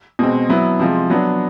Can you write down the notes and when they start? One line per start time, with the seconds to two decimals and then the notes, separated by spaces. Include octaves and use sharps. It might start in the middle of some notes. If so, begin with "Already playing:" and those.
0.19 B2 G#3 C4
0.49 F#3 B3 E4
0.79 C3 F3 G#3
1.10 F#3 B3 D4